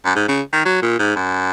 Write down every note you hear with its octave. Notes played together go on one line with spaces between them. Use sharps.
F#2
G#2
C#3
D#3
F#3
A#2
G#2
F#2